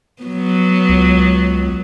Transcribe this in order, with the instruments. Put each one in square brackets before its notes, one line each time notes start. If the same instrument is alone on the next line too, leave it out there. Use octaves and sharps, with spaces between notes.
[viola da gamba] F#3 B3
[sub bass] C#2